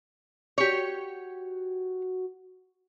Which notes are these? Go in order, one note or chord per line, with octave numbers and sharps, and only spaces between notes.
F#4 G4 C#5